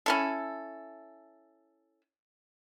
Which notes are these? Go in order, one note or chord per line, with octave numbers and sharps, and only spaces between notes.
C#4 E4 A4